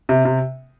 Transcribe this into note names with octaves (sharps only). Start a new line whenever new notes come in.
C3
C3